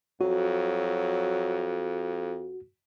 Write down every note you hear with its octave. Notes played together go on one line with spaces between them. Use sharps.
F2 F#3 F#4